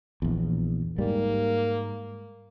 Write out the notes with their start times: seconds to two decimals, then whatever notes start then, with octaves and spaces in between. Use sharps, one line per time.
0.22 A#1 E2
0.98 G#2 G3 A#3